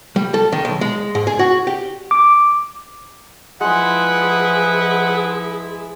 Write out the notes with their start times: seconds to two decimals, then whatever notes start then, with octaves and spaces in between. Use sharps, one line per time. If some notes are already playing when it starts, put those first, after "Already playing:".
0.16 G3
0.34 A4
0.52 D#3
0.65 B1
0.81 G#3
1.15 G#2
1.27 G#4
1.39 F#4
1.67 G4
2.11 D6
3.61 F3 G#3 E4 G#4 B4 F#5 C6